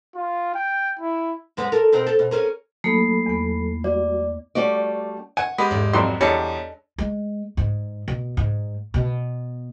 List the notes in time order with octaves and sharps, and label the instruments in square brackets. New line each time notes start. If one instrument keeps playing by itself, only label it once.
[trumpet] F4
G5
E4
[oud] F#2 G#3 B3
A4 A#4
B2 C4 A#4
A4
B2
C#4 G#4 A#4
[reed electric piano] F#3 A4 B5 [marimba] A3 A#3 D#4 [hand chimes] C7
[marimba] E2 B3
[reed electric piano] G3 F#4 [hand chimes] D5
[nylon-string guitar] G3 A3 C#4 F#4 D5
[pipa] F#5 [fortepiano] G#5
[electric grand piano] G#3 G4 [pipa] B3
[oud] E2 G#2
[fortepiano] F2 F#3 C6 [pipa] G3
[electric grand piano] E2 [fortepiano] G3 [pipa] G#3 D4 A4 [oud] C#5
[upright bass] G#3
G#2
B2
G#2
B2